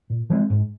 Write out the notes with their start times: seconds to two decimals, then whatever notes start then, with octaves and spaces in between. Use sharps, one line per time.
0.10 A#2
0.30 F3 G#3 C4
0.50 G#2